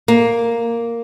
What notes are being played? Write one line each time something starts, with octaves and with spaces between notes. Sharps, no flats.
A#3